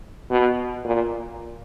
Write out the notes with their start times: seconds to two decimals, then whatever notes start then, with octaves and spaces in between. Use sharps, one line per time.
0.30 B2
0.84 A#2